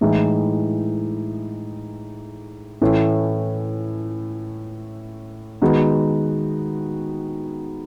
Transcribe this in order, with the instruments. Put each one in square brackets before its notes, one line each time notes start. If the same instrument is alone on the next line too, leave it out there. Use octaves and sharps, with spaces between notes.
[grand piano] A2 E3 G#3 D#4
A2 E3 A3 C#4
D#3 G#3 B3 D#4 F#4